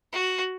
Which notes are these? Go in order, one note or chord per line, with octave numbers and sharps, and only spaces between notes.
F#4